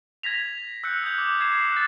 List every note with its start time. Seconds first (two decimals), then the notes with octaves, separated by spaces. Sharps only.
0.23 G#6 A#6 B6 F7
0.84 E6 F#6 G6 C#7
1.04 D#6 G6
1.18 D6
1.40 G#6 C7 E7
1.72 F#6 A6